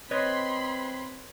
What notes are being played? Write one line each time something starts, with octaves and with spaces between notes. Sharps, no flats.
C4 B4 C#5 D#5 B5 C6